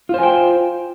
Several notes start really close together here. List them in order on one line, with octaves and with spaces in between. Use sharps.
F4 C5 G#5 G5